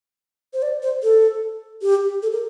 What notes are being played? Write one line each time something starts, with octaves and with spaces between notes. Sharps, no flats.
C5
D5
C5
A4
G4
A4
A#4